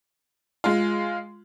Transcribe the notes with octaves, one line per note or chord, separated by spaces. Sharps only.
G#3 F4